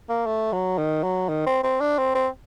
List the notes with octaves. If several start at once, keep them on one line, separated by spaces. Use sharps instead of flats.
A#3
A3
F#3
D#3
F#3
D#3
C4
C4
D4
C4
C4